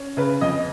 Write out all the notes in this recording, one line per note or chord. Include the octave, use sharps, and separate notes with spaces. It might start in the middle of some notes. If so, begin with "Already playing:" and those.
Already playing: C#4
C#3 B4
F2 D#5